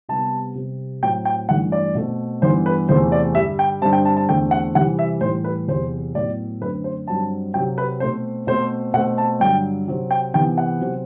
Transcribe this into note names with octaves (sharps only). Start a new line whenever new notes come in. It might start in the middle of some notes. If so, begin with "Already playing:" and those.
C3 G3 B3 A5
C3 G3 C4
A2 F#3 C4 G5
G5
G2 E3 A3 F#5
D5
B2 A3 C4
G2 E3 B3 C5
B4
E2 C3 E3 A3 C4 C5
D5
G2 D3 G3 E5
G5
G2 D3 G3 C4 A5
G5
A5
A5
E2 D3 A3 C4 G5
F#5
C3 E3 G3 C4 F#5
E5
A2 E3 G3 C5
B4
E2 C3 F#3 C5
A2 F#3 B3 D5
F#2 D3 A3 C4 B4
C5
G2 F#3 C4 A5
C3 F#3 C4 G5
B4
B2 A3 C4 C5
B2 A3 C4 C5
B2 A3 C4 F#5
A5
G2 D3 F#3 G5
C3 F#3 C4
G5
C3 E3 B3 G5
F#5
C3 F#3 C4